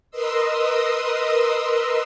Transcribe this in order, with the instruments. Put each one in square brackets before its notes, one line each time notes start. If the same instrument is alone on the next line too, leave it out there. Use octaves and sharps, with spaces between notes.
[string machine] A#4 B4 D#5 C6 D#6 E6